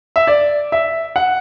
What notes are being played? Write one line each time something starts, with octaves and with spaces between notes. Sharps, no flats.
E5
D5
E5
F#5